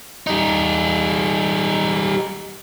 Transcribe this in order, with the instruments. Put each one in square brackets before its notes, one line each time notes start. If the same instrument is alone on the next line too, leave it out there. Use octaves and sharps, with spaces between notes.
[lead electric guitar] G3 D#4